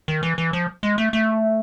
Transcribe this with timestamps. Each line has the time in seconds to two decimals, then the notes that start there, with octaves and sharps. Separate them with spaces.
0.08 D#3
0.23 E3
0.38 E3
0.53 F3
0.83 G#3
0.98 A3
1.13 A3